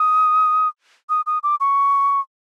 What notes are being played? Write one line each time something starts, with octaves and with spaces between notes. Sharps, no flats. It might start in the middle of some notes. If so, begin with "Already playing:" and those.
Already playing: D#6
D#6
D#6
D6
C#6